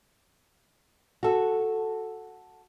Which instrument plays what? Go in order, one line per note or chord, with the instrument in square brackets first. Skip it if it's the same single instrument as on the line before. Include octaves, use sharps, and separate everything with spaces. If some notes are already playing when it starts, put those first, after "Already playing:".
[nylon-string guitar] F#4 A4